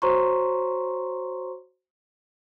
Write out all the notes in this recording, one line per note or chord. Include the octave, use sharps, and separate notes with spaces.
F#4 C5 C#5 A#5 C6 C#6